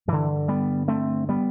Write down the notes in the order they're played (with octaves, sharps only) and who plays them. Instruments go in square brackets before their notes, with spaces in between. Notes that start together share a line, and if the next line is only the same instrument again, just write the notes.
[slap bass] G2 D3 E3
G3 B3
A3 C4
G3 B3